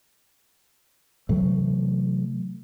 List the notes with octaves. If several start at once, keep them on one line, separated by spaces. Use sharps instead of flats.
C3 E3 F#3 A3